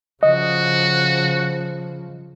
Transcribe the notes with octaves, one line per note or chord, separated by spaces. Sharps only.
C#3 F3 F#4 D#5